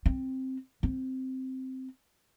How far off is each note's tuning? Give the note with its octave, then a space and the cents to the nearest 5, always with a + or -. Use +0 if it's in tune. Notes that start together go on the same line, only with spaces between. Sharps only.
C4 +5
C4 -5